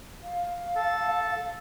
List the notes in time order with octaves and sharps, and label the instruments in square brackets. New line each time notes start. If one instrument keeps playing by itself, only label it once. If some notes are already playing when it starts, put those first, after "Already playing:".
[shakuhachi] F5
[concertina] A4 A5